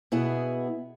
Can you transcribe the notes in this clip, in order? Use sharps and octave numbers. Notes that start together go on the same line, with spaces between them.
B2 B3 E4 G#4